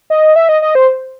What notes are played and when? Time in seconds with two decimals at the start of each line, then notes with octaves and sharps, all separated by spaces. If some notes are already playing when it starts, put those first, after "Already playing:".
0.10 D#5
0.36 E5
0.49 D#5
0.62 D#5
0.75 C5